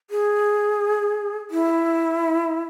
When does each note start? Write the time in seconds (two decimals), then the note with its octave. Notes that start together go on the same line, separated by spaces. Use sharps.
0.10 G#4
1.51 E4